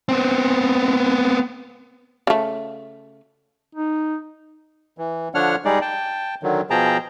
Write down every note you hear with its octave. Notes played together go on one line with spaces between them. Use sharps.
B3 C4
C#3 A3
D#4
E3
D3 F3 D4 C#5 F#5 F6
G3 G#3 D#4 G#4 D5
G5 A5
D3 D#3 F#3
B2 F3 G#4 G5 A5 A#5